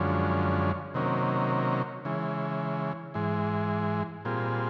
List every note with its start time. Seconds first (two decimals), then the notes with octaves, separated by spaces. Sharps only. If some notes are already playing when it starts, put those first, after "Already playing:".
Already playing: F#2 D3 F3 G#3 C#4
0.94 C3 D#3 F#3 A#3 C#4
2.05 C#3 E3 G#3
3.14 G#2 E3 G#3
4.25 A#2 G3 C4 F4 G#4